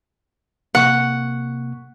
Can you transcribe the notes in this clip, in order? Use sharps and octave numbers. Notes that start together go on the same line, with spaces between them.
C3 A#3 F#5 C#6